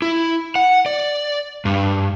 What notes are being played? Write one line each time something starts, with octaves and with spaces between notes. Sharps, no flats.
E4
F#5
D5
G2